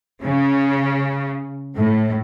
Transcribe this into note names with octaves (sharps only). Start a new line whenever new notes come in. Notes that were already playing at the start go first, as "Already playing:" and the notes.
C#3
A2